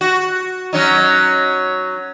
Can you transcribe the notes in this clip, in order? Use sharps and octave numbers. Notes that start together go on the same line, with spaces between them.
F#4
F#3 C#4 D#4